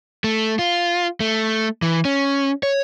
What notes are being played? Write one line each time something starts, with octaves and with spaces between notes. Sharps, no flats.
A3
F4
A3
E3
C#4
C#5